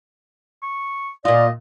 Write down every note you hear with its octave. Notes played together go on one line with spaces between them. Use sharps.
C#6
A#2 F4 D5 D#5